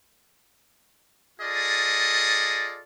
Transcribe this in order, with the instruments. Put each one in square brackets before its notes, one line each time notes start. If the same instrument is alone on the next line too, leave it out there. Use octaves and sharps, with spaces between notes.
[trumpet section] F4 G#4 A4 D5 D#5